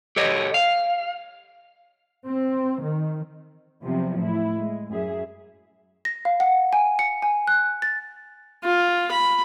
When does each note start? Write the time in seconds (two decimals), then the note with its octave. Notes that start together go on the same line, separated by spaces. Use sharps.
0.16 G4 A4 C#5 D#5
0.54 F5
2.26 C4
2.82 D#3
3.83 E2 C3 F3 F#3 C4
4.20 A2 E4
4.57 G#3
4.90 F#2 G#4 E5
6.05 A#6
6.25 F5
6.40 F#5
6.73 G#5
6.99 C#7
7.22 G#5
7.47 F#6
7.82 A6
8.64 F4
9.11 B5